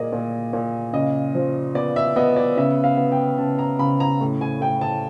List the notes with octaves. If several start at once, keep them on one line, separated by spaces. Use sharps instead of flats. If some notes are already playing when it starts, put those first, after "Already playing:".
Already playing: A#2 A#3 G#4 D5 D#5
A#2
A#2
C#3 D#5
F3
B3 D5
E5
B3 D#5
D5
C#3 E5
F5
B3
G5
C#3 A5
A#5
C#3 B5
A#5
A2
G#5
A2 G5
A5